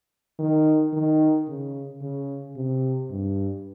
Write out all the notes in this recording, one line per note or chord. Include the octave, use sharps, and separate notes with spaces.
D#3
D#3
C#3
C#3
C3
G2